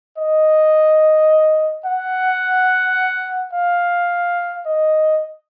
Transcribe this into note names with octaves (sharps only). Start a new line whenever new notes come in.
D#5
F#5
F5
D#5